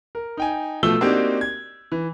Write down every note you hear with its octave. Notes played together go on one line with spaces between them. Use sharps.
A#4
D#4 G5 G#5
B2 F3 A3 E6 G7
A#3 C4 D4 D#4 F#4 G4
G#6
E3